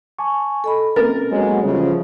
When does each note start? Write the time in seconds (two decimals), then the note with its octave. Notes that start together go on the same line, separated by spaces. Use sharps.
0.19 G#5 A5 C#6 D6
0.64 A4 D#5 B5
0.96 A#3 C4 C#4 A#4 A6
1.31 F#3 G#3 B3
1.63 C#3 E3 F3 G3